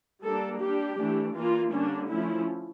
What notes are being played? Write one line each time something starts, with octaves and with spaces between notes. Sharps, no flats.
G3 A#3 D4 A4
G3 D4 G4
E3 A3 D4
E3 A#3 D4 F4
D3 G3 A#3 C#4 D4
F3 A3 C#4 E4